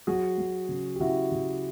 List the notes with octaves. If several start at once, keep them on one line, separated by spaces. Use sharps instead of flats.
F#3 F#4 G#4
F#3
C#3
G4
C#3 E4 F#4
C#3